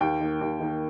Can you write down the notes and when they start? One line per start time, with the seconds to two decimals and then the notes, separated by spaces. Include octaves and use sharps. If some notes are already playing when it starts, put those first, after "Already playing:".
0.01 D#2 G5
0.20 D#3 A#3
0.41 D#2
0.60 D#3 A#3